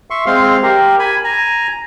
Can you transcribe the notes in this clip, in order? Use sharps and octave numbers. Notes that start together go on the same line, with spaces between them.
E5 C6 C#6
G#3 C4 F5 C6
G4 A#4
G#5 B5
G#5 A#5